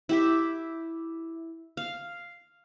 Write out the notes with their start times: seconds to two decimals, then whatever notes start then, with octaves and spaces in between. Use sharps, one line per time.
0.09 E4 G4 E5
1.77 F5